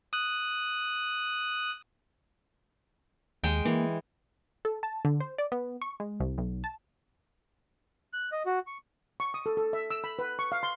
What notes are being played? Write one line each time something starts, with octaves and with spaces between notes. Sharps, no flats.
D#6 F#6
D#2 G#3 G5
E3 A#3
A4
A5
D3
C5
D5
B3
C#6
G#3
C2
B1
A5
F#6
D#5
F#4
C#6
C#6
D#6
A4
A4
E5
E6
B5
B4
C#6
F5
C6